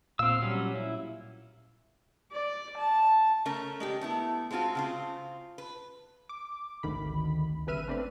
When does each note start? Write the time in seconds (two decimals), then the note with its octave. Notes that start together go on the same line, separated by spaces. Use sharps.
0.19 A#2 C4 F5 E6
0.42 F#3 G3 C#4
0.75 E4
2.32 D5
2.77 A5
3.45 C#3 A3 C#4 A#4 A#5
3.80 G#3 D4 G4
4.01 A3 B3 E4
4.51 G#3 A3 C4 F4 F#4
4.75 C#3 C4 F4
5.58 B4
6.29 D6
6.83 G#1 D2 D#3 B5
7.67 G1 C#3 B4 E5 F6 D#7
7.88 A3 C4 D4 B4